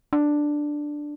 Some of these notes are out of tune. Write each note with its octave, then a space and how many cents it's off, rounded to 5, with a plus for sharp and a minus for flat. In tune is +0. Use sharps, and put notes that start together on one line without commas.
D4 +5